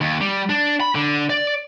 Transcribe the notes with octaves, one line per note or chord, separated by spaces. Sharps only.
D#2
G3
D4
B5
D3
D5